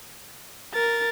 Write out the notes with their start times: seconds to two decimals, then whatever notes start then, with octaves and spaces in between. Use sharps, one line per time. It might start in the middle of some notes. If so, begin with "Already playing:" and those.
0.74 A#4 A6